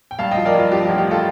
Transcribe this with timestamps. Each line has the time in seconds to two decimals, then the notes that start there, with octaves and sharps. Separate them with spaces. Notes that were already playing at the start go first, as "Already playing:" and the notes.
0.11 G5
0.19 G2 F5 A5
0.31 D#5 G5
0.37 F3
0.45 A#4 D5
0.55 G2 F4
0.72 F3 G4
0.85 A1 G4
0.98 G4
1.11 F4 A4